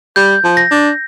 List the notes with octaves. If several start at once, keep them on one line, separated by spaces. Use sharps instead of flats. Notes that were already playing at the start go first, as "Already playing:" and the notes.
G3 G6
F3
A#6
D4